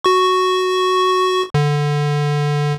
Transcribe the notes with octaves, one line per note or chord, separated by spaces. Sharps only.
F#4 C#6
D3